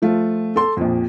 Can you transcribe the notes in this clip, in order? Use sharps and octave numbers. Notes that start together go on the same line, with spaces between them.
F3 A3 F4
A4 C6
A#1 F2